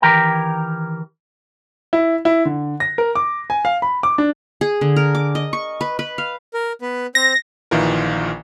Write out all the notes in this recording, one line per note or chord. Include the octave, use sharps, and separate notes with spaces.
D#3 E3 G4 A#4 G5 A#5
E4
E4
D3
A#6
A#4
D6
G#5
F5
B5
D6
D4
G#4
D3
A#4
D6
D#5
C#6
B4
B4
F5
A#4
B3 B4
C4 C5 A#6
A#1 D#3 E3 F4 A#4